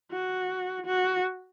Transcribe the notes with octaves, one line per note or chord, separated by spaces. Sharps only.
F#4
F#4